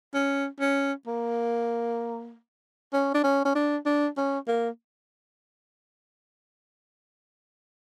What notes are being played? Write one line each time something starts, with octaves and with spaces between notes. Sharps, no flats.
C#4
C#4
A#3
C#4
D4
C#4
C#4
D4
D4
C#4
A#3